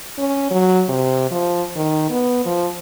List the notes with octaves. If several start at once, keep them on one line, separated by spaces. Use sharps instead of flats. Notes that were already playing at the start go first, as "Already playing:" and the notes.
C#4
F#3
C3
F3
D#3
B3
F3